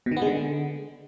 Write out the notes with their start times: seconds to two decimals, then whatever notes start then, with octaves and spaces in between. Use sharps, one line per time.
0.06 B2
0.11 D#3
0.17 B3
0.22 G#3
0.27 D3